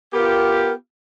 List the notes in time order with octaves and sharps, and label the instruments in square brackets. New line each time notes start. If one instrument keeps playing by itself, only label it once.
[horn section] B3 F4 G4 [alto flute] A#4